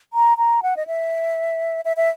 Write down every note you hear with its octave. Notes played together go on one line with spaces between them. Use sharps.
A#5
A#5
F#5
D#5
E5
E5
E5